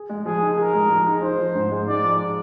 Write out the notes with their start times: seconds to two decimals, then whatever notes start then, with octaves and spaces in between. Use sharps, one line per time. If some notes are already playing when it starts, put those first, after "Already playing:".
Already playing: G#4
0.10 G#3
0.25 F3 G#4
0.41 D#4
0.58 G#4 A#4
0.74 G#3
0.91 F3
1.07 D#4
1.22 D#4 C5
1.38 F3
1.55 G#2
1.72 G#3
1.88 D#4 D5
2.03 F3